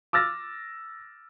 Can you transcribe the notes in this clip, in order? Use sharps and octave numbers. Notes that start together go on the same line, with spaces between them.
D6 E6 F6 A6 A#6